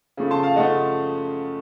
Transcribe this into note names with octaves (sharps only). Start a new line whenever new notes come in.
C#3 F3 A3
A5 C6
F5 A5
C#3 F3 A3 D#5 F#5